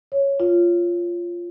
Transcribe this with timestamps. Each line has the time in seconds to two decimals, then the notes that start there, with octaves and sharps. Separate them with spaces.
0.12 C#5
0.40 F4